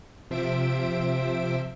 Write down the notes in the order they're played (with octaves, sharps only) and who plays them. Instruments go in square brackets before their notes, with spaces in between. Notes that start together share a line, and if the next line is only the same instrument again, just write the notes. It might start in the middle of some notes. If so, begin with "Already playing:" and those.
[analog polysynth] C3 F3 C5 E5 D7